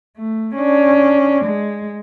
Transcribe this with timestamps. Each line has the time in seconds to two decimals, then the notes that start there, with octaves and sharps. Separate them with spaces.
0.17 A3
0.56 C#4 D4
1.45 G#3